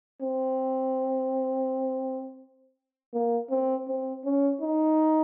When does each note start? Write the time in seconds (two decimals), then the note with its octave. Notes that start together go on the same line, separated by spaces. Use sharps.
0.21 C4
3.14 A#3
3.50 C4
3.88 C4
4.25 C#4
4.61 D#4